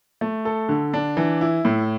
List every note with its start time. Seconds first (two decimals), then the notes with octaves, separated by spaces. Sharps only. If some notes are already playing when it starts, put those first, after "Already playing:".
0.21 A3
0.45 A4
0.69 D3
0.94 D4
1.17 E3
1.41 E4
1.65 A2